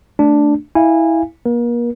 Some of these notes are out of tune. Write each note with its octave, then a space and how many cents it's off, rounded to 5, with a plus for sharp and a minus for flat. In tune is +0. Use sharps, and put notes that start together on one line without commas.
A3 +0 D4 +0
E4 -15 F5 -25 G#5 -20
A#3 +35 A#4 +40